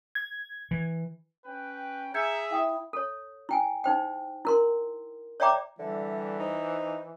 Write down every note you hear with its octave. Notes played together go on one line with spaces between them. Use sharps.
G#6
E3
C#4 B4 G5
G#4 E5 A#5 G6 G#6 C#7
E4 F5 G5 D#6
A4 C#5
E4 G5 G#5
D#4 C5 G5
E4 A#4 C6
C#5 D5 E5 G5 A#5 D6
D3 E3 G3 E5
D#4 C5